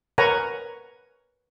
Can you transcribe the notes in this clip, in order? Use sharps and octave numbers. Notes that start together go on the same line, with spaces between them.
A#4 B4 C#5 F#5 G#5 A#5